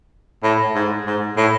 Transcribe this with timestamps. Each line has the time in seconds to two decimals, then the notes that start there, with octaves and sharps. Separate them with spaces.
0.43 A2
0.75 G#2
1.06 G#2
1.37 A2